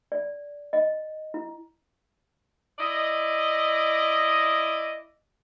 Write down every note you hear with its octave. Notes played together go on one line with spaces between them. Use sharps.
D5
D#5
E4
E4 D5 D#5